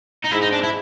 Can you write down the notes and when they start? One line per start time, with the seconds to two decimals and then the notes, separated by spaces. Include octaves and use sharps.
0.25 D#4
0.32 G#2 E4
0.43 D#4
0.53 D4
0.63 E4